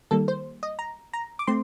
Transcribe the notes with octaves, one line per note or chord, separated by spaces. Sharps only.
D#3 G3 A#3 A4
C5
D#5
A#5
A#5
D6
A3 C4 C6